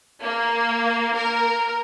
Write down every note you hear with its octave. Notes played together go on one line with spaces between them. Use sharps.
A#3
A#4